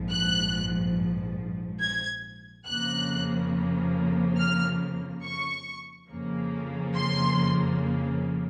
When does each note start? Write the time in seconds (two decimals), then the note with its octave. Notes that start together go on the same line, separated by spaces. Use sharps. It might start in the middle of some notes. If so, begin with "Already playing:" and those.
Already playing: A#1 G#2 F3
0.10 F#6
1.81 G#6
2.66 F2 C#3 F3 A#3 F#6
4.38 F6
5.23 C#6
6.09 F2 C#3 F3 A#3
6.95 C6